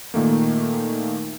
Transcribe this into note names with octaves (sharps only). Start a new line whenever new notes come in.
A#2 D#3 A3 A#3